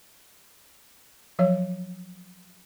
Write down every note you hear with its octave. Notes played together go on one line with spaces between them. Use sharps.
F3 F#3 C#5